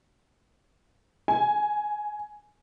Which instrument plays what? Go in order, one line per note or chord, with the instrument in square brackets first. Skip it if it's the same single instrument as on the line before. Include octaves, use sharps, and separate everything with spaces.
[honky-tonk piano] G#5